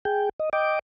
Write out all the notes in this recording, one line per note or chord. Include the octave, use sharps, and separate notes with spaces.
G#4 G5
D#5
D#5 G5 D6